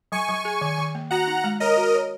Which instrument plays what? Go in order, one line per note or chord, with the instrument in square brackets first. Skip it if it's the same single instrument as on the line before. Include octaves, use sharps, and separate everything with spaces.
[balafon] F#3 [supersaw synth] G#5 C#6
[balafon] F#3
G#4
D#3
D#3
A#3
[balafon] F#4 [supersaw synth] F#5 A#5
[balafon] D#4
G#3
[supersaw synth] A#4 D#5 [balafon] C#5
[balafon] F#4
C#5